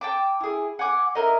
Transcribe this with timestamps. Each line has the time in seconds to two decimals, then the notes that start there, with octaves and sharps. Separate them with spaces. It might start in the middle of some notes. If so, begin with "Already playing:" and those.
0.01 G5 A5 D6
0.40 E4 G#4
0.79 F#5 G#5 D6
1.15 E4 A#4 D#5